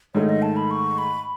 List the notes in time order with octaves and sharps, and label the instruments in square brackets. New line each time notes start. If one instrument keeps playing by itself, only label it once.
[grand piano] G#2 D#3 A3 D#4 [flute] C#5
[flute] D#5
A5
B5
C#6
B5